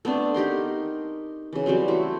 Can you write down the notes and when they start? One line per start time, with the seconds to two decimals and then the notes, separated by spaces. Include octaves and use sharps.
0.05 A3 B3 C4 D4
0.34 D#4 G4 A#4 C6
1.53 C#3 E3
1.66 E3 F#3 G3 C4
1.88 A3 E4 F#4 C5